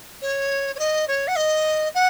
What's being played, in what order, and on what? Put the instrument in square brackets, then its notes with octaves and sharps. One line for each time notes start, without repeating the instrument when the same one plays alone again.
[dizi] C#5
C#5
D#5
C#5
F#5
D#5
F#5